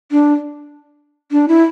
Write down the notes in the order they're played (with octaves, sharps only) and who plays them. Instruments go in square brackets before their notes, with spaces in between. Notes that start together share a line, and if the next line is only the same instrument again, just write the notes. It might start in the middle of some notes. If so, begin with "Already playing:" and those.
[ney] D4
D4
E4